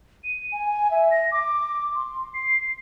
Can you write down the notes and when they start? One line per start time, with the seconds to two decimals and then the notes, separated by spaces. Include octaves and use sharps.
0.24 D#7
0.52 G#5
0.91 E5
1.11 A#6
1.32 D6
1.95 C6
2.34 C7